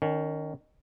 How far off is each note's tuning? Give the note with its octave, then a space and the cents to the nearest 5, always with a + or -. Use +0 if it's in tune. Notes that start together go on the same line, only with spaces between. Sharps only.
D#3 -15 C#4 +15